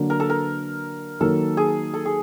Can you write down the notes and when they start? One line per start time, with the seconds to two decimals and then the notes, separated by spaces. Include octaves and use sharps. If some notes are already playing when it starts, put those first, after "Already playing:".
Already playing: D3 F#3 A#3
0.10 A#4
0.20 A4
0.30 A#4
1.20 D#3 F#3 A#3 A4
1.57 G#4
1.94 A4
2.05 G#4